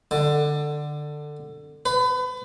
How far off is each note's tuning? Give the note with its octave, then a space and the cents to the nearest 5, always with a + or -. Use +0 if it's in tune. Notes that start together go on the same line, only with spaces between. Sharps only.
D3 +15
B4 +30